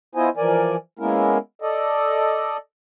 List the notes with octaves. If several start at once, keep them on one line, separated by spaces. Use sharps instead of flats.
B3 E4 F4 C5 D#5 G#5
E3 F3 A#4 D5 G#5
G#3 A#3 B3 C#4 E4 A#4
A4 D5 D#5